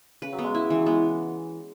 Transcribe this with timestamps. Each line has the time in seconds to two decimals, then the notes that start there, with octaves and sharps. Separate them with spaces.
0.22 C#3 B4
0.33 F#3
0.39 B3
0.44 G#3
0.55 E4
0.70 E3 F#3
0.86 G#3 B3